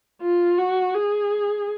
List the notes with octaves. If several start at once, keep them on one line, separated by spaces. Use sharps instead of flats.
F4
F#4
G#4